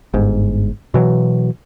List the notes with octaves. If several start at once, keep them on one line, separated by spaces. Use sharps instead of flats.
G1 G#2
B2 E3 F#3